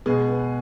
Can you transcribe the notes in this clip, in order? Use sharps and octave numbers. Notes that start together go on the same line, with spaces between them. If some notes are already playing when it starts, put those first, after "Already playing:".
B2 G#3 G#4
B3